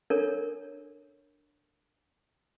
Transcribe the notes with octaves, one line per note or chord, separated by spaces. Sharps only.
D4 A4 A#4 C#5